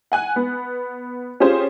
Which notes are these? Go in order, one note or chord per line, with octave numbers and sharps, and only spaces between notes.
F#5 G#5 F#6
B3
C#4 F4 G4 G#4 C5 C#5